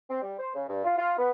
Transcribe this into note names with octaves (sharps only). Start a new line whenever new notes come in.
C4
G3
C5
C#3
G2
F4
F4
B3